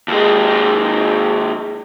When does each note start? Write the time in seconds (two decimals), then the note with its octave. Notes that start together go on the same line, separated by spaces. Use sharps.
0.08 D#2 G#3